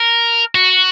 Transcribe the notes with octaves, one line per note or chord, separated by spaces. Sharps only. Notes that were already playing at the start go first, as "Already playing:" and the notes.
Already playing: A#4
F#4